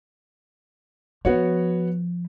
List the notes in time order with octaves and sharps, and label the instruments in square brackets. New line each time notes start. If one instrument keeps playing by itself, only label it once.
[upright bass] F3 [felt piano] B3 F#4 C#5